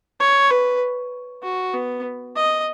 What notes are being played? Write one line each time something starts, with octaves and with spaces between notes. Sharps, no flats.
C#5
B4
F#4
B3
D#5